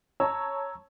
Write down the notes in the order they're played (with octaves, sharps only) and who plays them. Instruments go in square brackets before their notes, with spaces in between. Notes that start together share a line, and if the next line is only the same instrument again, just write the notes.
[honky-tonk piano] C#5 A5 [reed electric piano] A#5 E6